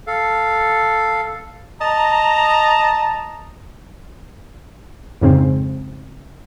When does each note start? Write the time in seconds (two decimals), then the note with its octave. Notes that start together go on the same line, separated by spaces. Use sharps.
0.07 A4 F5
1.81 D#5 A5 A#5
5.21 F2 G#2 C#3 C4